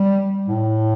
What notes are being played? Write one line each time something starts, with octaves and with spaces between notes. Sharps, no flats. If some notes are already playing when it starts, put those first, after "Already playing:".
Already playing: G3
A2